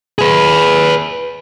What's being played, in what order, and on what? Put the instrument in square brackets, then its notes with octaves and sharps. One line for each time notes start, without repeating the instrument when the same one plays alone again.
[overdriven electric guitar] G#4 B4